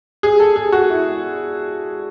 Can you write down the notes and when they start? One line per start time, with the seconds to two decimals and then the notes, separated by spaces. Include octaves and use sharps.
0.23 G#4
0.40 A4
0.56 G#4
0.72 F#4
0.90 E4